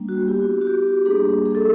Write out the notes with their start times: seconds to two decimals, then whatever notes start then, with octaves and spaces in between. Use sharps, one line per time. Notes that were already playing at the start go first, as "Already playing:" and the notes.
Already playing: G3 A#3 D4
0.09 F#4
0.27 B3 E4 G4
0.61 F#4
0.67 G4
1.06 G3 A#3 D4 G#4
1.45 G#4
1.55 A4